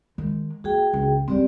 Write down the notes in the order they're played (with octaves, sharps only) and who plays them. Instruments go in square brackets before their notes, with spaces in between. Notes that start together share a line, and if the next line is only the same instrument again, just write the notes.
[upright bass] D#3 G#3
[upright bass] A#3 [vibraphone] F#4 G#4 G5
[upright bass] C#2
[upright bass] G3 C#4 [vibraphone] C4 G4 D5